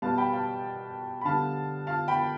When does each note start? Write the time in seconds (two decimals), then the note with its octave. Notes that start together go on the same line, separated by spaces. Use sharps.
0.02 B2 G3 B3 F5 A5
0.18 G5 B5
0.33 F5 A5
1.21 B5
1.25 D3 G3 B3 F5 A5
1.87 F5 A5
2.08 G5 B5